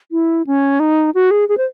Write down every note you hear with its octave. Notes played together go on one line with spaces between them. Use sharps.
E4
C#4
D#4
F#4
G#4
G#4
C5